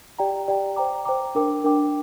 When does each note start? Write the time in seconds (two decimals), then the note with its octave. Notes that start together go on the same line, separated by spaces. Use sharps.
0.19 G4 D5 G5 A#5
0.48 G4 D5 G5 A#5
0.76 C5 G5 A#5 D6
1.05 C5 G5 A#5 D6
1.35 D4 A#4 G5 D6
1.64 D4 A#4 G5 D6